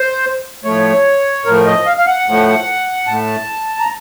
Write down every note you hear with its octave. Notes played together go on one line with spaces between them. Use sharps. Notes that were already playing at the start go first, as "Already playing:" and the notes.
Already playing: C5
A2 F3 A3 C#5
A2 F3 A3 A#4
D#5
F5
F5
F#5
A2 F3 A3
A2 A3 A5
A#5